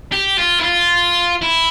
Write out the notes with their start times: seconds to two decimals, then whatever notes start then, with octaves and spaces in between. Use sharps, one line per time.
0.12 G4
0.38 F4
0.60 E4
0.64 F4
1.42 E4